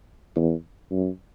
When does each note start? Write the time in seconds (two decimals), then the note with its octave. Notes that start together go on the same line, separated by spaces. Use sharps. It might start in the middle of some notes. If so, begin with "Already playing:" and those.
0.36 E2
0.91 F#2